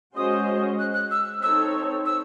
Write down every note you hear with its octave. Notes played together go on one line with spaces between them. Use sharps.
G#3 C#4 F#4 C5 D#5 D#6
F#6
F#6
E6
C4 D#4 A4 C#5 E6
E6